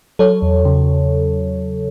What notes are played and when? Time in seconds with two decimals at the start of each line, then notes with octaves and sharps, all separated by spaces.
0.19 F#3 A4 C#5
0.42 E2
0.65 C#3